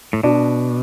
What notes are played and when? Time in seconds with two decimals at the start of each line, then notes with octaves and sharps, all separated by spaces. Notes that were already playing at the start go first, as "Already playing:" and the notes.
0.13 A2
0.23 B2 D4